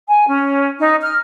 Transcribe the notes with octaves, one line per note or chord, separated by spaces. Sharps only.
G#5
C#4
D#4
F6